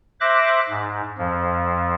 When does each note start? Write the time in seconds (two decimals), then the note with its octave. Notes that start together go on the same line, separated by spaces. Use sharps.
0.21 C5 E5 D6 F#6 A#6
0.69 G#2
1.18 F2 F3